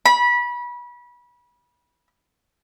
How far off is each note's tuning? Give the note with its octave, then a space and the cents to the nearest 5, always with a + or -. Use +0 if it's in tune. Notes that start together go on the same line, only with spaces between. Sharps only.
B5 -25